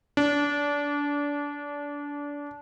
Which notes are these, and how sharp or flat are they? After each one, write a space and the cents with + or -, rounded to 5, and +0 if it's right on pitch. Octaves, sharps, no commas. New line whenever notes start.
D4 -25